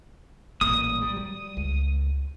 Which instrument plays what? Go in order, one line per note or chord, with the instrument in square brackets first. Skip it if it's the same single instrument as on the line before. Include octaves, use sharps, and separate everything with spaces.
[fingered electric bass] A1 A#2 G3 [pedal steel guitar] D#6
[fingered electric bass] G3
F#3 G3
C#2